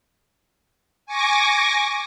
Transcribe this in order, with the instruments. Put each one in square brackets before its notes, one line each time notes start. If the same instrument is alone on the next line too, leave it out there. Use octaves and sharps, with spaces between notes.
[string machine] G#5 C#6 D6 A#6